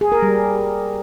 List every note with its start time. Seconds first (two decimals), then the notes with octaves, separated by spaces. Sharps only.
0.01 G#4
0.12 A#4
0.22 G3